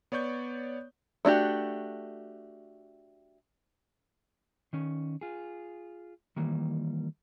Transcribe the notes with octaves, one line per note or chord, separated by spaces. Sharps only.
B3 C#5 D5 C#6 G6
A3 D4 F#4 G4
D#3 C#4
F4 G#4
D#3 E3 G3 A#3